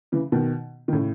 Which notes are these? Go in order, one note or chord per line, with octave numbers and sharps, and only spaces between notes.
C#3 E3
B2 D#3
D#3
A2 C#3